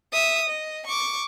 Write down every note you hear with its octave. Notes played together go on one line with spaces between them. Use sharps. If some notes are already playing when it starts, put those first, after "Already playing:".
E5 D#6
D#5
C#6 D6